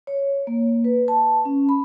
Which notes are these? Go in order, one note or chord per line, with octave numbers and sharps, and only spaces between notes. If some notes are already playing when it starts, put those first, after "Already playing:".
C#5
A#3
B4
A5
C#4
B5